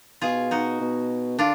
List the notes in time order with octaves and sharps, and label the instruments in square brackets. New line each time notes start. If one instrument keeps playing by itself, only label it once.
[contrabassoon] B2 [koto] F4 G#4
[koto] D#4 F#4
[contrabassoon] B2
[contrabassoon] D3 [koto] D4 F4